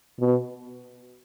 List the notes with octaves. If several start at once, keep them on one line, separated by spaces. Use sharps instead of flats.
B2